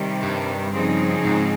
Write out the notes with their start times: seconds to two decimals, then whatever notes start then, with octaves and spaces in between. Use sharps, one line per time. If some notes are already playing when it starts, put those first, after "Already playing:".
Already playing: C3 D#3 G3
0.23 G2
0.73 C#3 F3 C4 D#4 G#4
1.25 G#2